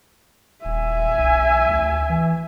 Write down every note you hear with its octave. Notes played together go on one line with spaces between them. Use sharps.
D#1 E5 G#5
B1
D2
E3